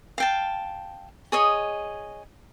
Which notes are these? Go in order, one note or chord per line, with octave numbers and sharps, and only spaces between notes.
F5 G5 A5
G#4 C#5 D#5